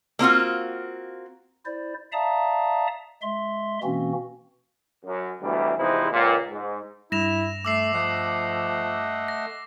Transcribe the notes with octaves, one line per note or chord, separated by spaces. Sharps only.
A#3 C4 F4 F#4
E4 C5 D5
D5 E5 F5 A5 A#5 D#6
G#3 E5 C6
B2 E3 A#3 C4 C#4 F#4
F#2
D2 B2 E3 F#3 G3
E2 C3 F3 G#3 D#4 E4
C#2 A#2
G#2
G2 E4 A#6 E7 F7
A3 D6 E6 C7
F3 A3 D#5 F#5
A#6